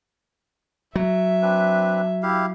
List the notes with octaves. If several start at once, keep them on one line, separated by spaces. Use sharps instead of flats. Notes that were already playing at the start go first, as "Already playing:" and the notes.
F#3 E5
C4 D4 B4
E4 G4 F5